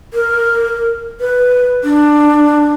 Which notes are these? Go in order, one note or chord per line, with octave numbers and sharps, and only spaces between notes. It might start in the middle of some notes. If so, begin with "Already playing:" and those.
A#4
B4
D4